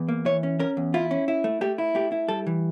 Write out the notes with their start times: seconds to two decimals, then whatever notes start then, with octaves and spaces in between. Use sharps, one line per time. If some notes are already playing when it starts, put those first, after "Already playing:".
Already playing: E2
0.09 A#3
0.25 E3 C#5
0.43 C#4
0.59 C#4 A#4
0.77 E2
0.94 E4 F4
1.11 C#4
1.28 E4
1.44 A3
1.61 A3 G4
1.78 E4
1.95 A3 G4
2.12 E4
2.29 G3 A4
2.47 E3